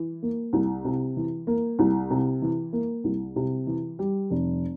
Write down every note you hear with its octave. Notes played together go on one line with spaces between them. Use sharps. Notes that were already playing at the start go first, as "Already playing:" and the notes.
Already playing: E3
A#3
C2
C3
E3
A#3
C2
C3
E3
A#3
C2
C3
E3
G3
F1